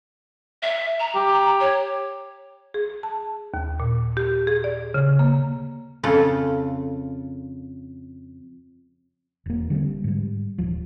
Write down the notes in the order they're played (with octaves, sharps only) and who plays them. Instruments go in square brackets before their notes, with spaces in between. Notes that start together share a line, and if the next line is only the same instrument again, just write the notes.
[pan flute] E5
A#5
[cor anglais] G4
[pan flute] C#5
[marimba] G#4
A5
D#2
A#2
G4
G#4
D5
C#3
A#3
[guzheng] F2 C#3 F4 A4
[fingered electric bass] E1 A#3
D3 G3 G#3 C4
G#2 G3
D#1 F3